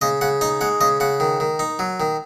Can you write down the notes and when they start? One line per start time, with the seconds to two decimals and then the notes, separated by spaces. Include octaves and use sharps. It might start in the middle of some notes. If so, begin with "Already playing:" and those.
0.01 C#3 D#5
0.21 C#3 F#5
0.41 D#4 D#5
0.61 G#3 F#5
0.81 C#3 D#5
1.00 C#3 F#5
1.20 D#3
1.40 D#3
1.59 D#4
1.79 F#3
2.00 D#3